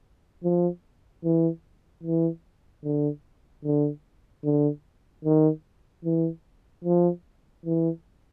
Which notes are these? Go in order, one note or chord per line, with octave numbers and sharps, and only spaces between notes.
F3
E3
E3
D3
D3
D3
D#3
E3
F3
E3